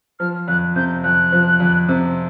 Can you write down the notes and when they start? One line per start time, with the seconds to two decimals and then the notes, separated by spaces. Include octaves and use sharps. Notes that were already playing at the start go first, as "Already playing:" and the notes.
0.20 F3 F6
0.48 F2 F#6
0.76 C3 G6
1.03 F2 F#6
1.32 F3
1.60 F2
1.89 C3